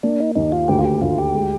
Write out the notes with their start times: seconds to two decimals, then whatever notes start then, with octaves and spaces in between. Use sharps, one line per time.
0.03 A#3 D4
0.20 D#4
0.35 D#2 D#4
0.52 F4
0.68 D2 G4
0.79 F4
0.85 G4
1.01 D2 F4
1.18 G4
1.34 G#3